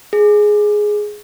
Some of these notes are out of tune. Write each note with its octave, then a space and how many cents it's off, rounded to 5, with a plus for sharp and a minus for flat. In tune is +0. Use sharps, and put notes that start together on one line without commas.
G#4 +5